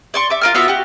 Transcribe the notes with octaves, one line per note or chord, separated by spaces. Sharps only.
D5 C6 C#6
E5 D6
F4 A#4 F6
B3 F4 F#4 E5
F#4 G4